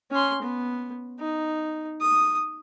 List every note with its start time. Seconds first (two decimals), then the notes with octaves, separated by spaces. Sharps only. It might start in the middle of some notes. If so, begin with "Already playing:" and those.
0.11 C#4 C6
0.43 B3
1.20 D#4
2.01 D#6